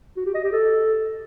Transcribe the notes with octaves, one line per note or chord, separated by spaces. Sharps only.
F#4
G4
D#5
G4
A4